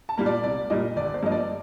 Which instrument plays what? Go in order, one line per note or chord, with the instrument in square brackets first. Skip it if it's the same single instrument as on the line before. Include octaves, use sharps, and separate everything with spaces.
[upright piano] A5
A#2 G3 A#3
D5
C2 D5
A#2 G3 A#3 D#5
G1 D5
C5
G2 F3 A#3 D#5
D5